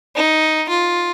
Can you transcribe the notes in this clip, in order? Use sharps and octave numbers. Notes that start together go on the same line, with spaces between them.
D#4
F4